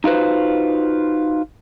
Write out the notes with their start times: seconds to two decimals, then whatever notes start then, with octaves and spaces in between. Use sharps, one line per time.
0.04 D#4 F4 F#4 B4 C5